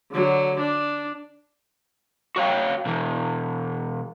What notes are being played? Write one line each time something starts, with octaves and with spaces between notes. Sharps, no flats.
D3 F#3
D4
F#4 C#5 F5 G5
B2 E3